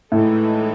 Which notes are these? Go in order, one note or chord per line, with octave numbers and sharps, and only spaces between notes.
A2 E3 G#3 D#4 A4